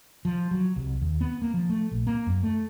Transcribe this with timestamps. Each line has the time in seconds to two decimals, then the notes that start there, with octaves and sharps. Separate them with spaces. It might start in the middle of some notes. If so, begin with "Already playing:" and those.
0.25 F3
0.51 F#3
0.76 C2
1.01 D#2
1.21 B3
1.42 A#3
1.54 F3
1.69 A3
1.91 A#1
2.07 A#3
2.27 F#2
2.43 A3